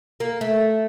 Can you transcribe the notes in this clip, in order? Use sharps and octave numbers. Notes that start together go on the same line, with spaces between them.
A#3
A3